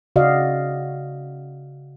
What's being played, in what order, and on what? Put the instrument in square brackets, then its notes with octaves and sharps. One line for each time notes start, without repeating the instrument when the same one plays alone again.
[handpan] C#3 F#4 D5 D#5 F5